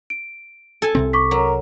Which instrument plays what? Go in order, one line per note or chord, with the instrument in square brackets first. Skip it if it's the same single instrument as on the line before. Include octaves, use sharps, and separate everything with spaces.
[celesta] D7
[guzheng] A4 G#5 A5
[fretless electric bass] C2 C3 C4
[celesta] C#6 D6 B6
[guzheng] F#3 [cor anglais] A#4